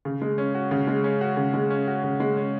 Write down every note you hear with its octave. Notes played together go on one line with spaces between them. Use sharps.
C#3
G#3
C#4
F#4
C#3
G#3
C#4
F#4
C#3
G#3
C#4
F#4
C#3
G#3
C#4